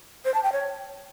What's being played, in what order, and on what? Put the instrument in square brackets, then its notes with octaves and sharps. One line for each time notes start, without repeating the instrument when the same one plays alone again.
[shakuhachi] C5
A5
G5
C#5